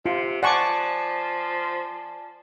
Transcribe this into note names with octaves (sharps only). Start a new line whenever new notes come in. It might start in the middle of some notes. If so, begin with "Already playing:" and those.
C3 F4
F3 D5 F#5 G#5 A5 C#6 D6